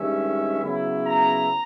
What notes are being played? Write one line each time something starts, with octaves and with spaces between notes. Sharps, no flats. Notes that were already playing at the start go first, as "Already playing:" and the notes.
Already playing: G2 D#3 G#3 C#4 E5
C#3 F#3 B3 E4
A#5